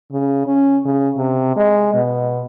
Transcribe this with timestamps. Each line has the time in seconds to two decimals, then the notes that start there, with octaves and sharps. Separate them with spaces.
0.12 C#3
0.47 C#4
0.85 C#3
1.16 C3
1.56 G#3
1.94 B2